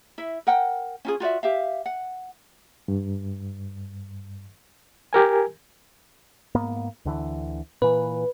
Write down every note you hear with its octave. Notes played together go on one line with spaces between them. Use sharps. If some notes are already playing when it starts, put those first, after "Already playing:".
E4 E5
A#4 F#5 G5
C#4 F4 G#4
F4 F#4 D5 E5
G4 E5 F5
F#5
G2
G4 A#4 G#5
G#2 A#3 B3
D2 D3 E3
A#2 E3 B4